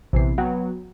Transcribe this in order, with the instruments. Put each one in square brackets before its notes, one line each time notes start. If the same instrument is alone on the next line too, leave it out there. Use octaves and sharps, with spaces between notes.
[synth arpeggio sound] A#1 C7 [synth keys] C3 E3 B3
[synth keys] F#3 B3 F#4 [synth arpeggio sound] F#5 G5 A#5